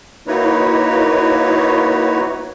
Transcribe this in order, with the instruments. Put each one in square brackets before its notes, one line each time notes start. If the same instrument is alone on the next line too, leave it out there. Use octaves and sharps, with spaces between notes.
[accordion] A#3 D#4 E4 F#4 B4 C#5